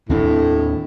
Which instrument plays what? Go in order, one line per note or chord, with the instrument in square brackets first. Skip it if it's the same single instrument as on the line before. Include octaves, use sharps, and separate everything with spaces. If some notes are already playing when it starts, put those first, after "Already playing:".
[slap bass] D#2 C4 D4 [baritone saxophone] A2